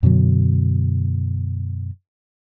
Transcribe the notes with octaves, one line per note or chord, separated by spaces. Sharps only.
F#2 B2 D3 F#3